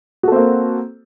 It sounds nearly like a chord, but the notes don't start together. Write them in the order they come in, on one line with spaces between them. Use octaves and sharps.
F#4 A4 C4 A#3